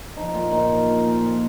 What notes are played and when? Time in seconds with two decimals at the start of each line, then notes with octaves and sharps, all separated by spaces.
0.17 F3 D#4
0.34 A#2 F4
0.52 A#2 D#4
0.70 F3
0.87 F3
1.05 A#2
1.23 A#2